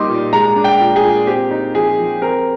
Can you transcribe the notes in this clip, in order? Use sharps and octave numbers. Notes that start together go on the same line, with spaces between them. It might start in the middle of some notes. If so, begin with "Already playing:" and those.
Already playing: G3 A#3 D#4 C6 D6
A#2
G#3 A#5
D4
G5
A#2
G#4
A#2
C4 G4
D#4
F3 G#4
F3
C4 A#4